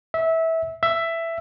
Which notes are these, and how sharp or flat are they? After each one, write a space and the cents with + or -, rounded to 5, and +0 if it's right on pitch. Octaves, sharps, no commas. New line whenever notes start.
E5 -20
E5 +10